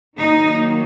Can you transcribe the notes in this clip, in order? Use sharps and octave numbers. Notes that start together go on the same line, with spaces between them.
D#3 F#3 A#3 D#4